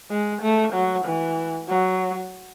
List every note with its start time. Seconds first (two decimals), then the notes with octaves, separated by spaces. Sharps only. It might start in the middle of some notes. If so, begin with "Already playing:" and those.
0.10 G#3
0.42 A3
0.73 F#3
1.05 E3
1.69 F#3